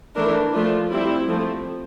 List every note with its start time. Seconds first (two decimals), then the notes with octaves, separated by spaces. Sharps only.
0.16 E3 A3 D4 A#4
0.54 F3 A3 D4 F4
0.91 G3 C4 E4
1.28 F3 A3 C4